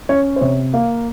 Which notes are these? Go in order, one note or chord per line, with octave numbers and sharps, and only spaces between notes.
C#4 C#5
C5
C3 C#5
A#3 F5